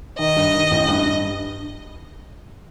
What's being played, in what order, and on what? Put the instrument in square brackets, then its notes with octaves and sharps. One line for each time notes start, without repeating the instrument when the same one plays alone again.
[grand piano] D#3 [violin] D#5
[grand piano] G2
D#3
A1
G2
G2